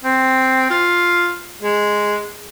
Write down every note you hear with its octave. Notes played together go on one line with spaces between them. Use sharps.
C4
F4
G#3